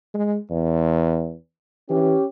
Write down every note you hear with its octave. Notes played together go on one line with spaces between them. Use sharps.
G#3
E2
E3 C#4 G4